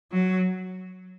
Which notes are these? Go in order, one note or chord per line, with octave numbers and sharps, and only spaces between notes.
F#3